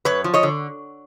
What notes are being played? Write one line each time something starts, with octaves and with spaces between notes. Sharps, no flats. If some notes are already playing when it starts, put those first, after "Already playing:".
F#2 B4 C#5
F3
C#5 D#5
D3